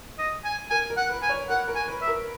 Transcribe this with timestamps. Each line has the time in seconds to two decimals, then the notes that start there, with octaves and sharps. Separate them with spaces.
0.18 D#5
0.44 G#5
0.70 A#4 G#5
0.90 A#4
0.97 F#5
1.10 B4
1.22 G#5
1.29 C#5
1.49 A#4 F#5
1.68 A#4
1.75 G#5
1.88 B4
2.01 E5
2.08 A#4